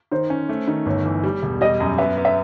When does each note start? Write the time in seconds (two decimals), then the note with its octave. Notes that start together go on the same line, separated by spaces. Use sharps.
0.12 D#3 C5
0.30 C#4
0.49 A3
0.68 D#3
0.86 G1 C#5
1.06 E3
1.24 G3
1.43 E1
1.61 G3 D#5
1.80 F#2
1.98 B3 E5
2.18 B3
2.25 E5